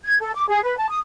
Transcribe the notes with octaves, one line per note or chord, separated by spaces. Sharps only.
G#6
A4
D6
G#4
B4
A5
D#6